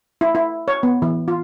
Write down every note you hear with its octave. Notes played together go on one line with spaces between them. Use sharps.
E4
E4
C#5
B3
E3
F4